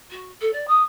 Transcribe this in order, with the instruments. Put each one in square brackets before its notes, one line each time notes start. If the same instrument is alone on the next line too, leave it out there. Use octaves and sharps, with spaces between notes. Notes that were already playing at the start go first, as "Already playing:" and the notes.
[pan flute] F#4
A4
D5
D#6